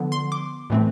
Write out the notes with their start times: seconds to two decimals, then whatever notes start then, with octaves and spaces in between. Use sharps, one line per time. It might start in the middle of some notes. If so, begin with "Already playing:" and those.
Already playing: D3 F3 B3
0.12 C6
0.32 D6
0.70 A2 E3 A3 C4